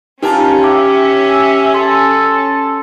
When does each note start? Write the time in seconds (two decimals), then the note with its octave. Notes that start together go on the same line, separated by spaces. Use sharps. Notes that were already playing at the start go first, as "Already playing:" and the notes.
0.23 C#4 D#4 F4 G4 A#4 A5
0.63 E5 G5 D6
1.74 A4 C6